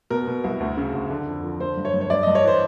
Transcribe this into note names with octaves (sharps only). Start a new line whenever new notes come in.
B2 A#4
B2
C2
D2
C#3
D2
D3
F2
F3
D3 C5
G2
C#5
G2
C#5
G2 D5
G2 D#5
C#5
E3 C5